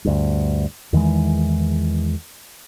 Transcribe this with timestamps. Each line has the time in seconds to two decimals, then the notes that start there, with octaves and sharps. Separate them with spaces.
0.05 D2 G2
0.93 E2 D#3 E3 G#3